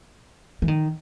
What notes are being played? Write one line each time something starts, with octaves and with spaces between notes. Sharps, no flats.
E3
D#3